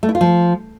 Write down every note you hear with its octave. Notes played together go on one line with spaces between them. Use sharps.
A3
E4
F4
F3